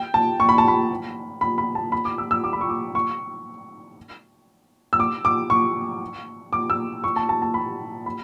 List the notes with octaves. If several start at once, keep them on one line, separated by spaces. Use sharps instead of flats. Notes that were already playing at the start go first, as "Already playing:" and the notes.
Already playing: G5
A5
C#6
B5
A5
B5
B5
B5
A5
B5
D6
E6
E6
D6
B5
C#6
D6
C#6
E6
D6
D6
C#6
D6
E6
C#6
A5
A5
A5
B5
B5